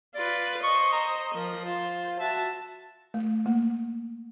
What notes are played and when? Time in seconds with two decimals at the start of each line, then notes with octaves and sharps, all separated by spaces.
0.15 F4 B4 D5
0.64 C5 D#5 C#6
0.93 A#5
1.35 F3 A#4
1.65 F4 C5
2.20 F#4 E5 A5
3.14 A3
3.46 A#3